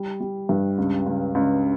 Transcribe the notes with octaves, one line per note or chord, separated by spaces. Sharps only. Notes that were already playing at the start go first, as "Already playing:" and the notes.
Already playing: G3
G3
G2
C#2
C#2
C#2